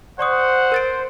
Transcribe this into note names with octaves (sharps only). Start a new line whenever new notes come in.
C5 D5 F#5 C#6 D#6
A#4 A6 D7